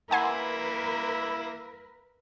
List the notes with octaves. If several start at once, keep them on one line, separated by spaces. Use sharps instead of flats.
A#3 E4 A#4 B4 F#5 G#5 B5 C6